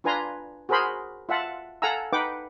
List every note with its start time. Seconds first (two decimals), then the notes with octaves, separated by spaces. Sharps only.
0.04 D4 F4 B4 G#5 A#5 C6
0.69 F#4 G#4 A#4 C5 B5 C6
1.29 F4 E5 F#5 A5
1.82 A4 F5 F#5 G#5 A#5 E6
2.13 D#4 B4 F#5 G5 D6